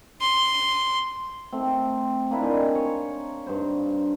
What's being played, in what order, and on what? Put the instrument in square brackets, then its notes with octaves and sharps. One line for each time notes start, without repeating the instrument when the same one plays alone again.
[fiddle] C6
[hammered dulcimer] A3 C4
A#3 D4 E4 D5
C5 D#5 G#5
C#5 C#6
G2 C5